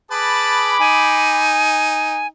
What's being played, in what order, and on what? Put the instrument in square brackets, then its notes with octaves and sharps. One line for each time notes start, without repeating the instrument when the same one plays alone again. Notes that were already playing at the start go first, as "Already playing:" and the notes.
[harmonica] G#4 B4 A5 [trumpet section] B5 D6
[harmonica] D#4 [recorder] G#5